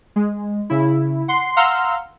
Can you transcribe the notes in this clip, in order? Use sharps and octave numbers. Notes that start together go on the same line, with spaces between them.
G#3
C#3 E4
F#5 C6 C7
F5 F#5 A#5 C6 E6 F6